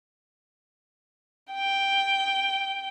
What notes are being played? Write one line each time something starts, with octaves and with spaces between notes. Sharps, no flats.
G5